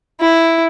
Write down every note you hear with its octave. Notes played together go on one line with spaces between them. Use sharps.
E4